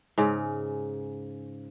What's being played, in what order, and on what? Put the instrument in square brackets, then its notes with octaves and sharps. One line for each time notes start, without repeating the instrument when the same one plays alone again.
[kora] G#2 C#3